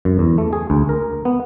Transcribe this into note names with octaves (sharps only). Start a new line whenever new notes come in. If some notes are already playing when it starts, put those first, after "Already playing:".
F#2
E2
A3
G#4
D2
A#4
B3